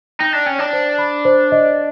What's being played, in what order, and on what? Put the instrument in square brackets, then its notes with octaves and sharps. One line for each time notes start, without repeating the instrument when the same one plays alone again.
[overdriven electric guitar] D#4 [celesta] G5
[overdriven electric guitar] D4
[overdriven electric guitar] C#4 [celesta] G5
[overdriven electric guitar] D4
[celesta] C5
B5
C5
D#5